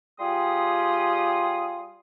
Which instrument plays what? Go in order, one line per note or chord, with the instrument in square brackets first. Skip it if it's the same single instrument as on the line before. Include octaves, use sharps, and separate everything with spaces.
[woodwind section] G3 F4 G4 G#4 C6 D#6